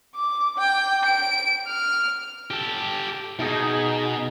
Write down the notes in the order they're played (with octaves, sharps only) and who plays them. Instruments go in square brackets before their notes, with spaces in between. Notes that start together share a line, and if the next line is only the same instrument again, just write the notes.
[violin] D6
G5
D7
F6
[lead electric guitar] G4 A4
[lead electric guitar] B2 [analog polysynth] D#4 G#4